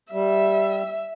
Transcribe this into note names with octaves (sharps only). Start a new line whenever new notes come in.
G3 E5